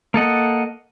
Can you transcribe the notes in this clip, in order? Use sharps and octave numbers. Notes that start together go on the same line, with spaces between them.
A#3 A4 D#5 F#5